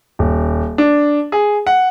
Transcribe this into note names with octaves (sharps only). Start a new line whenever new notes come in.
D#1
D4
G#4
F#5